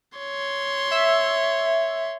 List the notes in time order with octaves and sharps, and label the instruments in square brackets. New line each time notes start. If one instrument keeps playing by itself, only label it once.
[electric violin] C#5 C6
[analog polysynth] E5